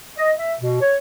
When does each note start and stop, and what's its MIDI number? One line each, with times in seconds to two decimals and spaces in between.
0.17 0.32 75
0.38 0.53 76
0.60 0.77 47
0.81 0.96 73